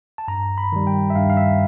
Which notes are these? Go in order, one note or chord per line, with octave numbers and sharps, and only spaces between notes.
A5
G2 A#5
B5
D#3 G3
G5
E5
G2 F5
F5
E5